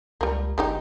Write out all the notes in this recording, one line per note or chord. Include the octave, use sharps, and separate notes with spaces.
C#2 G3 A#3
G1 G#3 D#4 G4